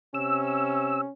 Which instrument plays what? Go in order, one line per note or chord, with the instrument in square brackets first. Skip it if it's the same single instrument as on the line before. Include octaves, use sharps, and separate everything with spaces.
[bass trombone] C3 [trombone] C#4 [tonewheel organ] E6